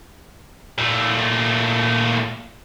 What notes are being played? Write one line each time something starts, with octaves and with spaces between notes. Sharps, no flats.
A#2 A3